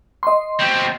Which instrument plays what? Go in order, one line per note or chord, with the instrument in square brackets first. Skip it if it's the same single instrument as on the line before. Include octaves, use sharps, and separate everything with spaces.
[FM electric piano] D#5 C6
[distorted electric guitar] B2 C4